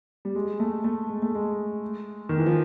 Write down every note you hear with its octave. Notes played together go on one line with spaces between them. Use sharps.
G3
G#3
A3
A3
G#3
A3
G#3
D#3
E3
F3